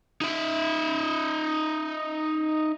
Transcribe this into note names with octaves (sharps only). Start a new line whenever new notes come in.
D#4 E5